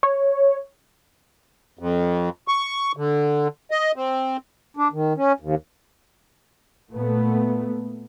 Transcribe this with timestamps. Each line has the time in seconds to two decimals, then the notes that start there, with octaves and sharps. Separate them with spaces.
0.03 C#5
1.79 F2
2.48 C#6
2.97 D3
3.71 D#5
3.96 C4
4.77 D4
4.93 D#3
5.17 C#4
5.40 D#2
6.93 A#2 A3 B3